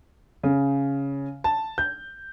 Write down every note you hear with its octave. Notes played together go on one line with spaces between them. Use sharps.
C#3
A5
G6